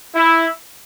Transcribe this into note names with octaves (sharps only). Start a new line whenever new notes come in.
E4